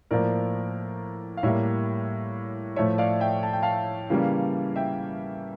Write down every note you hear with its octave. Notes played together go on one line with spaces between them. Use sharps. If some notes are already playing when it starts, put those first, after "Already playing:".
A2 F3 A#3 A#4 D5
F5
A2 G3 A#3 C#5 E5
A2 F3 A3 C#5 E5
D5 F5
E5 G5
A5
G5
F5 A5
C#3 E3 G3 A#3
E5 G5